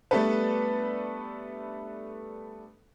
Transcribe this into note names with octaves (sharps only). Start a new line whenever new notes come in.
G3 A3 B3 D4 A4 B4